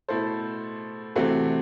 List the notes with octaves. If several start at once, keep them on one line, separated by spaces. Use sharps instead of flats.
B2 A3 E4 A4 C5
C3 E3 A3 C4 F#4